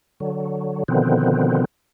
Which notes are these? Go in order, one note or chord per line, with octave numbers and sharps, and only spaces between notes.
D3 F#3
B2 D3 D#3 F3 B3 C4